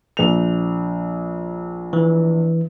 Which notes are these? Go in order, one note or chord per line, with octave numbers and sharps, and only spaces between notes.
A#1 F7
E3